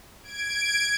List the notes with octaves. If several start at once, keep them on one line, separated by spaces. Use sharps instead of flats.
G#6 D7